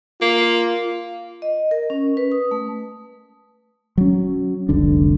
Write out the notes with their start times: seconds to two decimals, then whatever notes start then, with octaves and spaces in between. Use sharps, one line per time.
0.22 A#3 F4
1.42 D#5
1.71 A#4
1.90 C#4
2.17 B4
2.32 D#6
2.51 A3
3.98 F#3 C#4
4.69 F1 C2 D3 D4